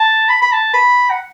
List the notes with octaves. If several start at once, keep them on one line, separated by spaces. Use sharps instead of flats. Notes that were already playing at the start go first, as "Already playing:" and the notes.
Already playing: A5
B5
B5
A5
B5
F#5